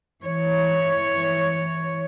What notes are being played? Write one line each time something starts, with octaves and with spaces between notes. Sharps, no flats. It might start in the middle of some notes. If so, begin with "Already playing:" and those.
E3 C#5